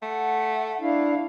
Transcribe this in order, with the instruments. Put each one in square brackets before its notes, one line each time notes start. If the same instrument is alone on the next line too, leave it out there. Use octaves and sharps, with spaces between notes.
[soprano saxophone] A3 [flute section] F#5
[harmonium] D4 E4 [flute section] F5